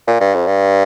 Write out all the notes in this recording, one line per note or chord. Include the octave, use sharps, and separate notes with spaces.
A#2
G2
F2
G2